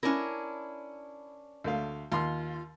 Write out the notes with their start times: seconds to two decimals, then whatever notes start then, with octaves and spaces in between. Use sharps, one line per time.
0.03 C#4 D4 E4 A#4
1.64 D2 A3 F5
2.12 D#2 F4 C6